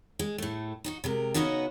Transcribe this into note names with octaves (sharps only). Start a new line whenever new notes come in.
G#3
A2 A3
D#4 F4 F#4
C3 G#3 A#4
C#3 B3 C#4 D#4 F#4 D#5